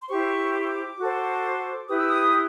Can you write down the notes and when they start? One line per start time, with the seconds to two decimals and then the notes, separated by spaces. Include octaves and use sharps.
0.01 C6
0.09 E4 G4 C5 C#6
0.54 D6
0.61 C#6
0.69 D6
0.99 F#4 A4 C5
1.88 E4 G4 B4 D#6
1.98 E6
2.08 D#6